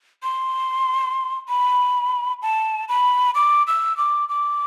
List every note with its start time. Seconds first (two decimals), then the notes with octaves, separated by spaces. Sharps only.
0.23 C6
1.49 B5
2.42 A5
2.89 B5
3.35 D6
3.67 E6
3.97 D6
4.29 D6